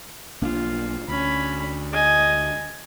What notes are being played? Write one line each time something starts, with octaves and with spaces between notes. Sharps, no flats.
B1 A#3 D4 F4
D2 C#4 B5
D#5 G#5